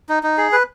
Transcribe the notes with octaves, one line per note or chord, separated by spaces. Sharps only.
D#4
D#4
G#4
B4